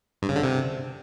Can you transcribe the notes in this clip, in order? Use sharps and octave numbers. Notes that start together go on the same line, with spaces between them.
G2
C#3
D3
C3